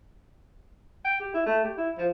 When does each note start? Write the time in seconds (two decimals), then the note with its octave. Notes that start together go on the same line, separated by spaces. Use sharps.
1.05 G5
1.19 G4
1.34 E4
1.46 A3
1.63 G4
1.77 E4
1.98 F3